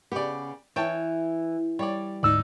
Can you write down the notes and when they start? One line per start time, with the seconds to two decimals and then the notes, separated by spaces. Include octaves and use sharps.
0.12 C#3 B3 G4 D5
0.76 E3 C#5 G5 A5
1.79 G3 C#5 D5
2.23 D2 G#2 D#4 D5 E6